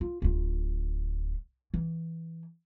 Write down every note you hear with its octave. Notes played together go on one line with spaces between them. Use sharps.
F4
D1 F4
E3